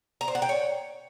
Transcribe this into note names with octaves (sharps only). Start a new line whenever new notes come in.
A#5
C5
F#5
G5
C#5